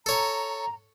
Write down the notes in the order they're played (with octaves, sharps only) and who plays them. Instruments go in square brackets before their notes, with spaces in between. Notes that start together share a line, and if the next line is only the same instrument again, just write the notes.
[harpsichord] A4 C#5 [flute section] A#5